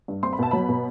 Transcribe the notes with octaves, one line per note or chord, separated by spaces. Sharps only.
G2
C4 C6
B5
B2 A5
F#3 B5
B2